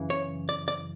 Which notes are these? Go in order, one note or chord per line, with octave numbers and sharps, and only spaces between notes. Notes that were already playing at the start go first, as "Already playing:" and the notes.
Already playing: F#2 C#3 E3
C#5
D5
D5